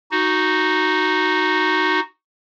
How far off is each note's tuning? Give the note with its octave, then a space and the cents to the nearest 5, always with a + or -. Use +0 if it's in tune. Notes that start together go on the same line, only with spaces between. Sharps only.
D#4 +0 F#4 +0